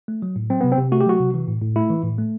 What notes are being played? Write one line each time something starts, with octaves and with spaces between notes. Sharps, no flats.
A3
F#3
A2
F#3 C4
C3 B3
C4
C3
A3 F#4
G4
F#3 F#4
C3
E3
A2
A2
A3 E4
E3
A2
A3